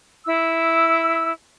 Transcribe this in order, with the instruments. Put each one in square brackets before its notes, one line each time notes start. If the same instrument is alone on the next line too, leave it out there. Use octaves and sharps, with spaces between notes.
[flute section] E4 E6